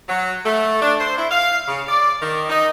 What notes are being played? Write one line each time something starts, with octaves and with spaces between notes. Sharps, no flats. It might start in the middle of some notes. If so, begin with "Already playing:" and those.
F#3
A3
D4
C5
E4
F5
C#3
D5
D#3
D#4